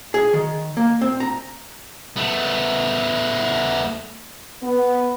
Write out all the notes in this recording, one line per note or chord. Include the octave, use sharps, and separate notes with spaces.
G#4
D#3
A#3
C4
A#5
A3 B3
B3